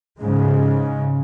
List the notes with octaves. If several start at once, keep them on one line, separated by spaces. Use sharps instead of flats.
G#2 C#3 G#3